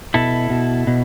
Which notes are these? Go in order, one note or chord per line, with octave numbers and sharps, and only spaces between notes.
B2 E4 A4
B2
B2